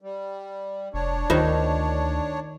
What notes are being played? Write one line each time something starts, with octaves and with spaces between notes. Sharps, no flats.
G3
F1 D4 C#5
D2 D#3 F4 A#4 C5